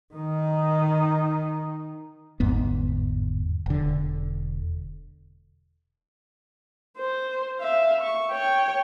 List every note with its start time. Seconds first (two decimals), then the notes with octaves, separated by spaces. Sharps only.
0.14 D#3 D#4
2.40 G1 E2 G#2 B3
3.66 E1 D3
6.97 C5
7.60 E5 F5
8.01 C#6
8.30 C#5 G5